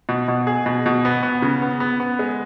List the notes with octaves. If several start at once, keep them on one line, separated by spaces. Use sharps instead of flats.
B2
B2
G#4
B2
B2
B3
B3
C#3
B3
B3
B3
G#3